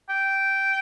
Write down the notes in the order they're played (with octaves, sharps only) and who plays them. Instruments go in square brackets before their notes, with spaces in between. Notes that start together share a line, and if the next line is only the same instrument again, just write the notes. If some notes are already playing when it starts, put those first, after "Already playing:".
[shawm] G5